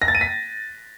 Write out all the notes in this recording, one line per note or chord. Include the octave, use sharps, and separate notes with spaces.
A#6
A6
D#7
B6